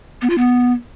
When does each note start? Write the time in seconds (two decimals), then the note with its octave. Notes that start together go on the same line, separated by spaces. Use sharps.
0.22 B3
0.30 F4
0.38 B3